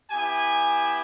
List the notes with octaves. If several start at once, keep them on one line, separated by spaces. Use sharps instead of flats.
B3 E4 G4 G#5